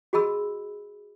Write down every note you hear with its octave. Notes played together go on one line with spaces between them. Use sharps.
F#4 G#4 D#5 B5 E6